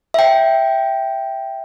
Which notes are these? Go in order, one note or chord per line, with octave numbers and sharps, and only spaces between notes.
E5 G5